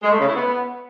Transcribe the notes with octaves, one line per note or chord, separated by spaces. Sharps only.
G#3
A3
C#3
E4
B3